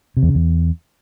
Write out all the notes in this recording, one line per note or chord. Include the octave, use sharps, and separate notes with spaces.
C3
E2
C#3
E2